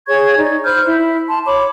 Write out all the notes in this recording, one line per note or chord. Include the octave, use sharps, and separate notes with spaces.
G#4 C#5 C#6 G#6
D#4 D5
C5 B5 F6 G6
E4
A5 C6
C#5 B5 D6